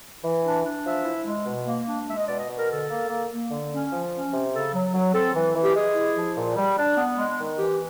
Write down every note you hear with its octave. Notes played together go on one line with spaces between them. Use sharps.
E3
D4
D4
F3 E5
E4
G#3
B2
A#3
D4
G#3 E5
D#5
B2 D5
D#5
B2
A#4
D3 A4
A#3
A#3
A#3
D3
C#4
F3
C#4
C3
C#3 A4
F#3
F#3
C4 A4
E3
E3
G4
G#3 G#4
E4
F3
A#2
G3
D4
B3
G#3
D#3
E3 G4